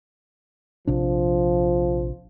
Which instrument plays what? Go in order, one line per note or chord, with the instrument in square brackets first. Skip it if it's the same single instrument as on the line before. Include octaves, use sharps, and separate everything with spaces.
[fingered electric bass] A#1 C3 D4 [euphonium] F3